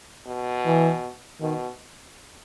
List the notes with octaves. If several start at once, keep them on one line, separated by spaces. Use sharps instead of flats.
B2
E3
B2 D#3